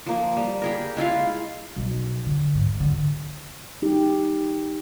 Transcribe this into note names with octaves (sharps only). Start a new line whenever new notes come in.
F3 A#3
G3
G4 G#4 A#4
G#3 E4 F4 F5
B1
D3
G#2
D3
D#4 G4